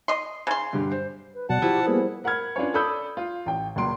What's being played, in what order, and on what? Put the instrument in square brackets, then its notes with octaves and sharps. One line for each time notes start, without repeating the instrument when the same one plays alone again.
[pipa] D#5 C6
C#3 C6
[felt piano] G2 D3 G3
C5
[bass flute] B4
[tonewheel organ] B2 F#3 [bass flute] D5 [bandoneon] F#5 A5
[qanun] F3 E4 [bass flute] F#4 [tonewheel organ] G4
[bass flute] G3 [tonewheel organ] A#3 B3 G#4
[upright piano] A#4 F#5 B5 F6 G#6
C#4 D4 F4 B4 C#5
A4 D5 B5 D#6 E6 G6
F4
A1 G5
C#2 A#2 F#3 C6 D7